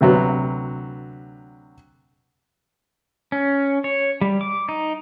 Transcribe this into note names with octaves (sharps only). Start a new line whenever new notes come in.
D2 C3 F#3 B3
C#4
C#5
G3
D6
D#4